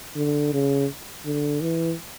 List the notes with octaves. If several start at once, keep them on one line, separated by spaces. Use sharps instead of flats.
D3
C#3
D3
E3